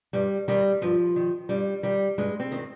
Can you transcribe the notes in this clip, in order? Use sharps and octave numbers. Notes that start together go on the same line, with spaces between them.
G2 G3
D#3 G3
G2 F3
D#3
G2 G3
D#3 G3
G2 G#3
C4
D#3